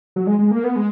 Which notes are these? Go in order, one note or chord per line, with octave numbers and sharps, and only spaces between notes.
F#3
G#3
G#3
A#3
B3
G#3